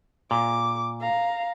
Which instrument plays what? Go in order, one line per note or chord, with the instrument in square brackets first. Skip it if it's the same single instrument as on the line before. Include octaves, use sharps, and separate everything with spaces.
[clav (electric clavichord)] A#2 [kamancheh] D6
[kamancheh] F5 A#5